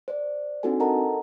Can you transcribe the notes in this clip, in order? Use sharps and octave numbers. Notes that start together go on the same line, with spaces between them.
C5 D5
C4 D4 D#4 F#4 A4 G#5
A4 A#4 D#5 F#5 A5 A#5